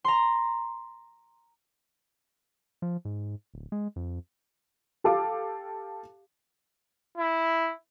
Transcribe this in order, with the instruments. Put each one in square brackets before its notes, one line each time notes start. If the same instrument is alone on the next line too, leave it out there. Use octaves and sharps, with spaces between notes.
[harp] A#5 C6
[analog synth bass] F3
G#2
D1
G#3
F2
[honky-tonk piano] G4 A4 F5 D6
[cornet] E4